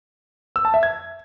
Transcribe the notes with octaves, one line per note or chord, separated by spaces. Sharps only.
E6
A5
E5
G#6